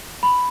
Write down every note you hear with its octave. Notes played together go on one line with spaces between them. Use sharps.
B5